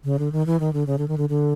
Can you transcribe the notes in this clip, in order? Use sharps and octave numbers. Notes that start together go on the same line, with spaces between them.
C#3
D3
D#3
E3
D#3
D3
C#3
D3
D#3
D3
D3